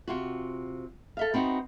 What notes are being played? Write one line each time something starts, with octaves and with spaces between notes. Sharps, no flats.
C3 F4 F#4
A4 E5 F5
B3 C4 D#4 F#4